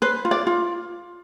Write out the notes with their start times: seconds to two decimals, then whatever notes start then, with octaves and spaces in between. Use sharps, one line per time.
0.02 B4 C5
0.25 F4
0.31 D5
0.47 F4